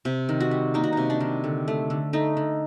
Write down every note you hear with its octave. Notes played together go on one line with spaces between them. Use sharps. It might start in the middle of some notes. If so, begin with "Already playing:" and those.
C3
D#3
F#4
G3
A#3 D#4
F#4
C3 D#4
D4
D#3
D3
A3
D3
A3 D#4
D3